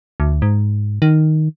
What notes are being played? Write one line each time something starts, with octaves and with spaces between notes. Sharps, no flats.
D2
G#2
D#3